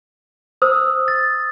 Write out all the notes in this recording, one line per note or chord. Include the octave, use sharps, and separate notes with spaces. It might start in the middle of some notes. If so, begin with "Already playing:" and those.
C5 D#6 E6
A6